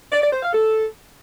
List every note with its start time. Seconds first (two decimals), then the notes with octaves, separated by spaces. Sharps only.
0.13 D5
0.23 D5
0.33 C5
0.43 F5
0.53 A4